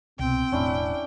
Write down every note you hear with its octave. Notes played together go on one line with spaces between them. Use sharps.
C2 B2 C4 G5
E1 A2 C#4 D4 E4